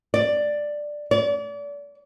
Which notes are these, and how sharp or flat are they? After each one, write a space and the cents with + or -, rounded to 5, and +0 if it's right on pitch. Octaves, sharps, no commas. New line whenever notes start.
D5 +10
D5 -35